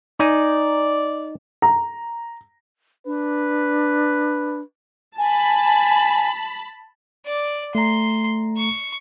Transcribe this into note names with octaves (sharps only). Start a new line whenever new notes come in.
D#4 D5 G#5
A#5
D4 B4
G#5 A5 B5
D5
A3 A#5 C6
C#6